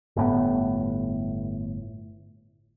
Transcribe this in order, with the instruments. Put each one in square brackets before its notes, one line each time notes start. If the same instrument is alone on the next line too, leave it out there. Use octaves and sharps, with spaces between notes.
[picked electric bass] G1 A2 B3